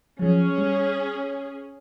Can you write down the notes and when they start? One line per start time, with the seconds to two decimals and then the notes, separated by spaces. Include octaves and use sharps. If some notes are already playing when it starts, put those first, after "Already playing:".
0.19 F3 F#3 C#4 G#4
0.58 G3